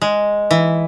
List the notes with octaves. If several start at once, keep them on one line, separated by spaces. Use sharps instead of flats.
G#3
E3